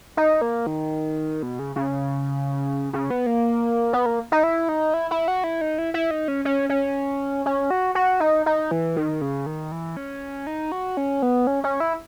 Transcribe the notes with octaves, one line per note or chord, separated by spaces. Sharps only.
D#4
A#3
D#3
B2
C#3
C#3
C#3
B3
A#3
B3
A#3
D#4
E4
D#4
E4
E4
F#4
E4
D#4
E4
E4
D#4
C#4
C#4
C#4
C#4
F#4
F#4
D#4
D#4
E3
D#3
C#3
D#3
E3
C#4
D#4
F#4
C#4
B3
C#4
C#4
E4